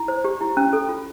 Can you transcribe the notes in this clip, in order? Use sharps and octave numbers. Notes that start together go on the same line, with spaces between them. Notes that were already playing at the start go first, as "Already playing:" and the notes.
Already playing: E4
C5
G4
E4
C#4
A4
F4